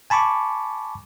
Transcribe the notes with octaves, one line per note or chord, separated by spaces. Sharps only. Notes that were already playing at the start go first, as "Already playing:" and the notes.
G#5 A5 B5 C#6 D6